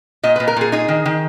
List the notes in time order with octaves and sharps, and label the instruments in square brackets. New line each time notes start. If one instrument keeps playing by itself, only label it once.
[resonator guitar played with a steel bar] A#2 D#5
B4
A#2
A#4
A#2 G#4
D#4 G#4
D#3
D#3